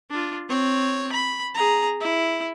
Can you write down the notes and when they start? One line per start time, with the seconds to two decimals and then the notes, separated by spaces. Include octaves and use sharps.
0.10 D4 F4
0.49 C4 C#5
1.12 B5
1.54 G#4 A#5
2.00 E4